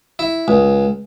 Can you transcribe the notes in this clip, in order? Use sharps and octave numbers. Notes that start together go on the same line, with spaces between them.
E4
C#2